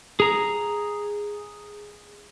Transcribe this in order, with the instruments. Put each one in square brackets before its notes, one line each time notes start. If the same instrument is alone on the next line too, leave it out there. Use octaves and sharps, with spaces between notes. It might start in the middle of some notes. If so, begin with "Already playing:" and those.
[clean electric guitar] G#4 A#5